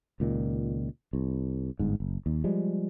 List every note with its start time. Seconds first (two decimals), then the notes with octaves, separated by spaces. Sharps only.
0.20 C#2 A#2 D#3
1.13 C2
1.79 G1 G#2
2.00 F#1
2.26 D#2
2.44 F3 G3 G#3